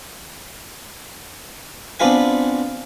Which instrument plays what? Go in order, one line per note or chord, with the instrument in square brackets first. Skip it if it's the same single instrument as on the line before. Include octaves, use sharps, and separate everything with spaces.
[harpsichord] B3 C4 D4 F4 B4 G#5